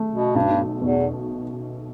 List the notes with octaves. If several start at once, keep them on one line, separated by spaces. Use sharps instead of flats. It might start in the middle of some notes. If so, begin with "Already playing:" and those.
Already playing: A3
B2
B1 G2
E2 B2